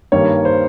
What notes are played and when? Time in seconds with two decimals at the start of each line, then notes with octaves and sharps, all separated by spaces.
0.12 G2 D#3 G3 A#3 C#5
0.45 C5